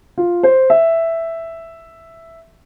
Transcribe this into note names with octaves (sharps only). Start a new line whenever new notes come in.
F4
C5
E5